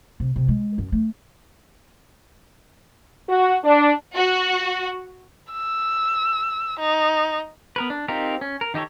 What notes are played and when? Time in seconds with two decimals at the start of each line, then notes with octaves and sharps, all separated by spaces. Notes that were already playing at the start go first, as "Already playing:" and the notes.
0.20 C3
0.36 C3
0.48 G#3
0.78 F#2
0.92 A3
3.29 F#4
3.64 D4
4.15 F#4
5.52 E6
6.80 D#4
7.76 B3 A#4 B4
7.90 D4
8.08 C4 D#4 F4 G4 A#4
8.41 C#4
8.61 A#4
8.74 D#3 D#4 G4 A4 C#5